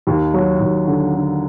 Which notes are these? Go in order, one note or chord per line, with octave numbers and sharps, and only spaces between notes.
D#2
F#3
D#2
D3
D3